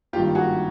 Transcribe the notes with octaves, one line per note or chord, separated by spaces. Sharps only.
G#1 G2 D#3 G3 A#3 F4 G4
F#4 G#4